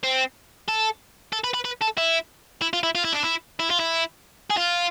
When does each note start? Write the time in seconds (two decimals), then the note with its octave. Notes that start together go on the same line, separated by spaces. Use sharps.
0.03 C4
0.68 A4
1.33 A4
1.44 B4
1.54 B4
1.65 B4
1.82 A4
1.98 E4
2.62 E4
2.73 F4
2.83 E4
2.95 F4
3.05 E4
3.13 D4
3.23 E4
3.60 E4
3.70 F4
3.80 E4
4.50 G#4
4.57 F4